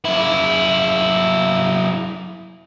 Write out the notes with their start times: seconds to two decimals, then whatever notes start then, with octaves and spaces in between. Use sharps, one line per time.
0.05 F#2 E4